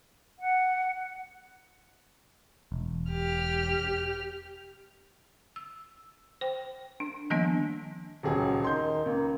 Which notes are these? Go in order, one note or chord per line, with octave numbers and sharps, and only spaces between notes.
F#5
E1
G4 F6
E6
C5 G5
D4
D#3 F3 G3 A#3 B3 D4
D#1 C#2 F#3 G#4
D#3 C6 G6
C#2 A#3